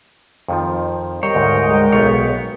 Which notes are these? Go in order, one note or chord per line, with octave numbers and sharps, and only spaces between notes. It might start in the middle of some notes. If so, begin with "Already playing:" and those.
F2 D#3 F3
G3 A#4 C5 C#5 D#5 G5
D2 G#2
G#3
B1 B3 C#5 F5